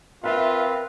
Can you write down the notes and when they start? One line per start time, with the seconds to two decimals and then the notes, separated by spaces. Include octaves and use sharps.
0.24 C4 F4 A#4 B4 E5 F5